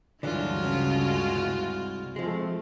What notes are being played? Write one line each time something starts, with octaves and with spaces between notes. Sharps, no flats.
D2 G2 D3 E3 F#3 G#3 F4 F#4
C#3
C2
F3 G#3 A3 C4